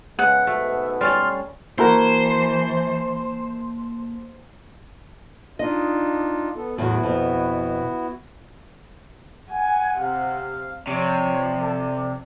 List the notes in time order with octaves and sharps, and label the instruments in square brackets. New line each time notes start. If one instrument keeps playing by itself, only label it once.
[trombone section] C#3 G#3 B3 [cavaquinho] F#5
[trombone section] G#2 B2 [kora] A3 [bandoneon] E5
[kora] G3 C#4 A4 [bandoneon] C6 F6
[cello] E3 [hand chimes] A#3 A5 [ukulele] E4 F#4 A#4 [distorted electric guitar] C5
[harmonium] D4 D#4 F4 [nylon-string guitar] D#5
[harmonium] B3 A4
[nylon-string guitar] E2 A2 F#3 [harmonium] B3 E4 F#4
[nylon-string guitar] F2 B2
[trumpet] F#5 [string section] G#5
[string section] C3 [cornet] F5
[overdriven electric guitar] C3 [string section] F3 [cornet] C#5 [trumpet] D5
[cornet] A4